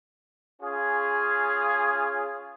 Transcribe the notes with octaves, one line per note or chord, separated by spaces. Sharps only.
C#4 F4 G#4